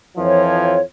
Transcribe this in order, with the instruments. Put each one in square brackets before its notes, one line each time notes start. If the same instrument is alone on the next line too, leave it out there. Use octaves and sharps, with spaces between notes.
[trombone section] F2 E3 F3 [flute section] C#5